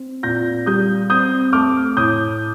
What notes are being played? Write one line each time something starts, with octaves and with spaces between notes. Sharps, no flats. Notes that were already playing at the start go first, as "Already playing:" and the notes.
Already playing: C4
A#2 G6 A#6
G3 D#6 G6
C4 D#6 G6
A3 D6 F6
A2 D#6 G6